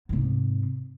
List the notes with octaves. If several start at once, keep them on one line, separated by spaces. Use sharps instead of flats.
G#2 C3